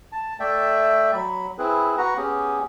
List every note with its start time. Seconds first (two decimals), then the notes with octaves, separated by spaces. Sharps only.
0.12 A5
0.40 A3 D5 E5 G5
1.14 F#3 B5
1.58 C4 E4 G#4 B4
1.98 F#4 B4 F#5 A#5
2.17 B3 C#4 G4 G#4